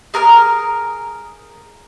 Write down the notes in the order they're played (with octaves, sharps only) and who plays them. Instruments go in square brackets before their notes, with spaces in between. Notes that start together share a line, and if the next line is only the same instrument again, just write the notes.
[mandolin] G#4 A#4 D#6 F6